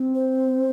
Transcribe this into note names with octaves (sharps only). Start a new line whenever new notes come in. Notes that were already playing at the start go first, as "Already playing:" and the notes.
Already playing: C4
C5